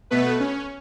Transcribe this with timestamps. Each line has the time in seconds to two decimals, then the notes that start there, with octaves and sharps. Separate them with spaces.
0.11 B2 A3 B3 B4
0.40 C#4